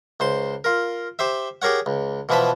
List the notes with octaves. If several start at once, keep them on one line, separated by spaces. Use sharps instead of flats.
C#2 C5 C6
F4 A#4
G4 C5 E5
G4 G#4 A#4 C#5 F#5
C#2
B2 E3 F3 B4 A5 B5